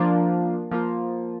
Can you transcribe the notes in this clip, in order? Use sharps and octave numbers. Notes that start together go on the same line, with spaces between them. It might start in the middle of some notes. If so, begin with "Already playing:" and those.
Already playing: F3 A#3 D4 F4
F3 A#3 F4